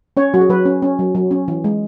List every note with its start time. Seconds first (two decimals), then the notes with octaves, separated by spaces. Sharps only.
0.17 C#4 C#5
0.34 F#3 F#4
0.41 G#4
0.50 F#3 B4
0.65 C#4
0.82 C#4
0.99 F#3
1.15 F#3
1.31 C#4
1.48 E3
1.64 G#3